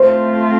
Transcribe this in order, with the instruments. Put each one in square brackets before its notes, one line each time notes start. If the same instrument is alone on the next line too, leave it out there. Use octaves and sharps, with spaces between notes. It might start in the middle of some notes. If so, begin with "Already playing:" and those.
Already playing: [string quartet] A3 C4 F4 [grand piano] C5